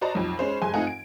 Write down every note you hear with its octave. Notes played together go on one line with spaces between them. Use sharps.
F#4 C5 D5 D#5 A5 A#5
B1 F2
G#3 C#4 C5 B5
F#1 G#3 G#5 C6 G#6
A3 C4 D#4 F4 F#5 G#5
D7